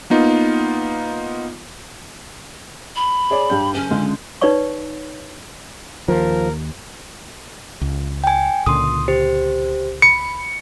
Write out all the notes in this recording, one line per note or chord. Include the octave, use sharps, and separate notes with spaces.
A#3 B3 D#4 F4
B5
G#4 C#5 D5
G2 G4 G6
F#1 C#4
C#2 D3 G#3
D#4 B4 C#5 D5 C#6
D#2 F3 A#4
C#2
G5 G#5
C#2 A#2 D3 C6 D#6
G4 C5
B5 C#7